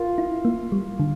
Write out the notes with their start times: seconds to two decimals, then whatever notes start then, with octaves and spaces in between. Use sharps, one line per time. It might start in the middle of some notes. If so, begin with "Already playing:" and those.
Already playing: F4 A#4
0.18 E4
0.45 A#3
0.72 G3
1.00 D3